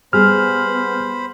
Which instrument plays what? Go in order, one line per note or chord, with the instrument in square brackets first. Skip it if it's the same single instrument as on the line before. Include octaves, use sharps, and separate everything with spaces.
[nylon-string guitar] G3 G#4 [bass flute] B3 [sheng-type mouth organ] C5 B5 [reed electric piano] F6